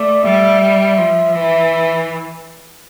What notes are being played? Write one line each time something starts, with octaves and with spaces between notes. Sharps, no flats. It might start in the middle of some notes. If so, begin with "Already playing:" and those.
Already playing: A3 D5
G3 E5
E5
F3
E3 E5